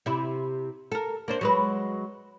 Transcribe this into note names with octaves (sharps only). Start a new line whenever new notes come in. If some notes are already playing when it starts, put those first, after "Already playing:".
C3 E4
A4 A#4
A#3 D4 C5
F#3 G#3 B4